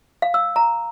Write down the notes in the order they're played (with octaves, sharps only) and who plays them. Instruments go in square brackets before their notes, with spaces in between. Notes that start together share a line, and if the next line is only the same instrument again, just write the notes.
[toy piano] F5
E6
A#5